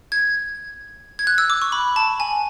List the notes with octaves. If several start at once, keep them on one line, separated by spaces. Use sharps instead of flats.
G#6
G#6
F#6
E6
D6
C#6
B5
A5
G#5